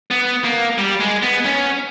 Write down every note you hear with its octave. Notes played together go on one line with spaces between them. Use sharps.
B3
A#3
G3
G#3
B3
C#4